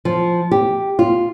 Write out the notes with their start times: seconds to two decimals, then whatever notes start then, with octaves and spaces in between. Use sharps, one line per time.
0.05 F3
0.51 G4
0.99 F4